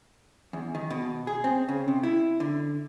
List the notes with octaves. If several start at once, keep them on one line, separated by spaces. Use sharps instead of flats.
E2
D#3
B2
G#4
C4
C#3
C3
E4
D3